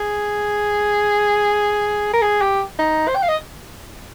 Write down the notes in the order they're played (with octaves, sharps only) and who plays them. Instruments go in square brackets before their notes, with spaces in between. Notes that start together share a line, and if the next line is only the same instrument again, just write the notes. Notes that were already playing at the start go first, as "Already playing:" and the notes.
Already playing: [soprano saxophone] G#4
A#4
G#4
G4
D#4
C5
G5
F5
D#5